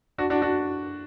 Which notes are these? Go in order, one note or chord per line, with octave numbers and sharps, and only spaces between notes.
D4 F#4
D4 F#4
D4 F#4